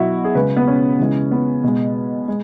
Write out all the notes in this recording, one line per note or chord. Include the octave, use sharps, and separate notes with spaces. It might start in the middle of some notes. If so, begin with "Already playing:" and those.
Already playing: B2 F#3 E4 F#4
G#4
C#3 G#3 B4
B3
C#4
C#3 E3 G#3
B3
B2 G#3
G#3